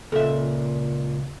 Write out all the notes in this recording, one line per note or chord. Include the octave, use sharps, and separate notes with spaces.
C#2 A#2 A4 E5